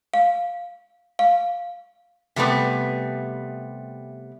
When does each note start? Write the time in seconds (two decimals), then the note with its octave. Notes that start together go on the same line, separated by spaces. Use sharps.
0.14 F5
1.19 F5
2.36 C3 G3 A3 B3